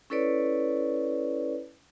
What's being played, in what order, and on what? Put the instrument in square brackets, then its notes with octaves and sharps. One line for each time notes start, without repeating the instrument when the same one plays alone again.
[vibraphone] C#4 E4 A4 B4 C#5 D5